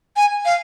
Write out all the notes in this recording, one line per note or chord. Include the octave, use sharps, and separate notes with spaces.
G#5
F5